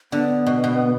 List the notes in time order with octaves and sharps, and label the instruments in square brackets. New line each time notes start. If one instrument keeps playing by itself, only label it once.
[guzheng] D3 [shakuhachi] B3
[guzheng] B2
B2